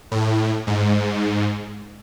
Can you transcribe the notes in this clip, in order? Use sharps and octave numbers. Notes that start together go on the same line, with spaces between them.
A2
G#2